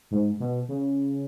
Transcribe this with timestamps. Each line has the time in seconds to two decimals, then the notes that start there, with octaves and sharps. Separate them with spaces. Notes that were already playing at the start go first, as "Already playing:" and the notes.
0.11 G#2
0.40 B2
0.68 C#3